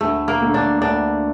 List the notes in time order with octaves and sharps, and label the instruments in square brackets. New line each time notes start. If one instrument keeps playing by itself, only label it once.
[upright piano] D2 [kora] A3
[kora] A#3
[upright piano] D3 A3
[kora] D4
[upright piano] D2 [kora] D4